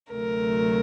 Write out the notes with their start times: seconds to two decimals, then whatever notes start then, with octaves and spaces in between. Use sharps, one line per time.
0.12 D2 C3 F#3 A3 A#4